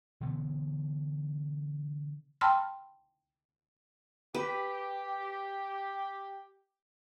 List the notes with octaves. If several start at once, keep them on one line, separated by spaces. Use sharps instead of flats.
B2 D3 E3 B3
G5 A5 B5 C6 E6 F6
G4 B4